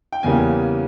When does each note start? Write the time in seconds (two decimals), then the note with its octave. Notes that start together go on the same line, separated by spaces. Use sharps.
0.12 G5
0.23 E2 C#3 G3 A#3 G#5